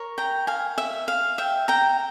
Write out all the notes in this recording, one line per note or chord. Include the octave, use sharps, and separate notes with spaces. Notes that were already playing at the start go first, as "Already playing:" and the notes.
Already playing: A#4 C#5
G5 A#5
F5 G#5
E5
F5
E5 G5
G5 A#5